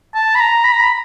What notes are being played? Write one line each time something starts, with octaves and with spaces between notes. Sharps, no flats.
A5
B5
A#5
B5
A#5
B5